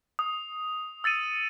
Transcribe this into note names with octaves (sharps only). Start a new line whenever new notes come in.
D#6
E6 A6 C#7 D#7